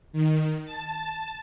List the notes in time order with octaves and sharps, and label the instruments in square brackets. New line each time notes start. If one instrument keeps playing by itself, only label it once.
[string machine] D#3
A5